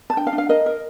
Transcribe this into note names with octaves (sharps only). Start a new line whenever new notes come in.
A5
D4 G5
F5
D4
F5
A#4 D#5
A#4